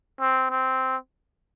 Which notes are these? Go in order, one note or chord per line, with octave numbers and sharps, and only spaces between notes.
C4
C4